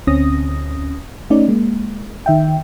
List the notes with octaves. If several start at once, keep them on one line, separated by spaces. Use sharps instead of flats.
D2 C4 C#4 D#6 A#6
A3 C#4 D#4 D5
G#3 A#3
D#3 E5 G5